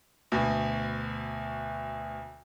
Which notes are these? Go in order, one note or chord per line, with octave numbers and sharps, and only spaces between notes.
D2 B2